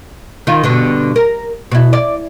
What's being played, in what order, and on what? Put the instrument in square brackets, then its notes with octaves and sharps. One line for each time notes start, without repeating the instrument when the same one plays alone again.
[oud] D#3 F4
G2 B2 D3
A#4
B2 E4
D5